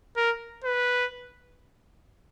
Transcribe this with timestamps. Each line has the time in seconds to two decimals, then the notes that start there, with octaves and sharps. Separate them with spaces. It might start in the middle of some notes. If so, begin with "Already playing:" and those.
0.17 A#4
0.64 B4